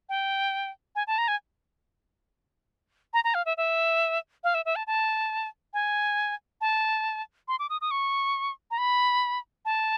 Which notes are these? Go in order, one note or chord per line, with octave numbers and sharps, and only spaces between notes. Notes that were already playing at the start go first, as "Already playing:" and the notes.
G5
G#5
A5
A#5
G#5
A#5
A#5
F5
E5
E5
F5
E5
E5
A5
A5
G#5
A5
C6
D6
D#6
D#6
C#6
A#5
B5
A5